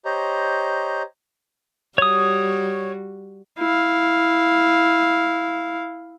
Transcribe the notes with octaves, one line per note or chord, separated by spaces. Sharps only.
G4 C5 C#5 D#5 A#5
G3 F#4 C#5 D#6
E4 F5